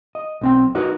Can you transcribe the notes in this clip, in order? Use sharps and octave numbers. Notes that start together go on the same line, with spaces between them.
D#5
B1 C4 G5
D#4 F#4 A#4 B4